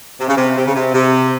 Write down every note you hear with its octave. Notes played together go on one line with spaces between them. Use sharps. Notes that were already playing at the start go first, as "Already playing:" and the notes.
C3
C#3
C3
C3
C#3
C3
C3